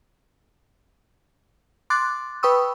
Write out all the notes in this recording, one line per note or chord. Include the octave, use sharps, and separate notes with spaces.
C6 D6 F#6 A6
B4 G5 B5 C#6 D#6 E6